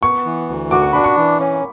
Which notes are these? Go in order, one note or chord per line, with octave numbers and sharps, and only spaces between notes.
B3 C#6
E3
D2
F#4 D6
C#6
D4 B5
C#6
E3
C#4